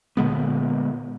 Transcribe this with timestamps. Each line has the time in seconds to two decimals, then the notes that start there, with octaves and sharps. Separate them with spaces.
0.17 A#2 D3 G#3 B3